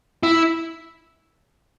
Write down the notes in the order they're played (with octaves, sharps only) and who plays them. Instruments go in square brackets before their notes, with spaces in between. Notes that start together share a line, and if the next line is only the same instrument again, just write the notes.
[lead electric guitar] E4